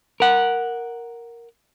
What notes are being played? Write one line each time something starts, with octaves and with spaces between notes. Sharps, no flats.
A#4 F#5